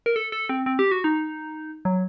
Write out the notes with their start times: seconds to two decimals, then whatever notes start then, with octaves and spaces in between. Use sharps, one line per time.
0.06 A#4
0.16 A4
0.32 A4
0.49 C4
0.66 C4
0.79 G4
0.92 F#4
1.04 D#4
1.85 F#3